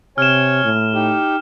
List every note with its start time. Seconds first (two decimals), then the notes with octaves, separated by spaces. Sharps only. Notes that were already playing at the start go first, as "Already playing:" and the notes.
0.18 C3 C#5 G#5 F6 E7
0.64 A2
0.93 D#4 G4